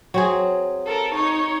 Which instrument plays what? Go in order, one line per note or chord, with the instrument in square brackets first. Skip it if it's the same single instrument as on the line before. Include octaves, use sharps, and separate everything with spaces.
[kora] F#3 C4 G#4
[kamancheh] A4 A#4
D#4 C#5